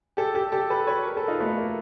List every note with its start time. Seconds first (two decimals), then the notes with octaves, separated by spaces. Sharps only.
0.17 G4 A4
0.35 G4 A4
0.52 G4 A4
0.70 A4 B4
0.87 B4 C#5
1.06 A#4
1.17 A4 B4
1.28 D#4 F4
1.40 A3 B3
1.57 A#3